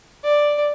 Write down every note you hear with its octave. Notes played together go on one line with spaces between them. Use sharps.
D5